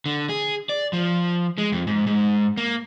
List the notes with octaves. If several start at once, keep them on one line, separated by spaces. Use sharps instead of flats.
D3
G#4
D5
F3
G#3
F2
G#2
G#2
A#3